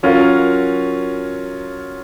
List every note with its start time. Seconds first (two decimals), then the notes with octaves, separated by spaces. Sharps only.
0.03 F#3 C#4 F4 A#4